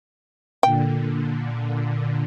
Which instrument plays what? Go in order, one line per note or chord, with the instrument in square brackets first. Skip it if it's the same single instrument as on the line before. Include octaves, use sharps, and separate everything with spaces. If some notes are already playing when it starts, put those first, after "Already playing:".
[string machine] A#2 D3 [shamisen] G5